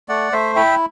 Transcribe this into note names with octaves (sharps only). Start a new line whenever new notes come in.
A3 D5 F#5
A3 C5 E5
E4 E5 G5